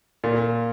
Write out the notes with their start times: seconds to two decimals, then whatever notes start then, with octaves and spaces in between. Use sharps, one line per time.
0.24 A#2